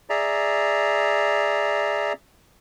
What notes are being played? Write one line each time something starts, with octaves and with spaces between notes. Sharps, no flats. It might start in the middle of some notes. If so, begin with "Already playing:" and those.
G#4 D5 E5 A#5